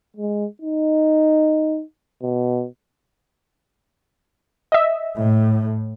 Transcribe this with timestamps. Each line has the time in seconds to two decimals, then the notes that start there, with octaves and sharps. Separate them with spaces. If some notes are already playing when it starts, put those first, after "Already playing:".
0.17 G#3
0.62 D#4
2.22 B2
4.72 D#5 E5
5.17 A2